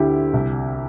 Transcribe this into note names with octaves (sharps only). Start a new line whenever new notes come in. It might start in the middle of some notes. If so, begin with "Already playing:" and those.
Already playing: D2 D3 E4 G4
C2